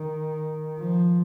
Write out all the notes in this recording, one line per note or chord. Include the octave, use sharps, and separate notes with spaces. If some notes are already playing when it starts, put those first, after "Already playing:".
Already playing: D#3
F3